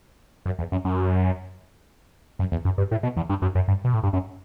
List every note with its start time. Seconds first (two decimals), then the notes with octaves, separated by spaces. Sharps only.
0.46 F#2
0.59 E2
0.72 F#2
0.85 F#2
2.39 F#2
2.52 E2
2.65 F#2
2.78 G2
2.91 A2
3.03 B2
3.17 E2
3.29 G2
3.42 F#2
3.55 F#2
3.68 G2
3.84 B2
3.94 A2
4.03 G2
4.13 F#2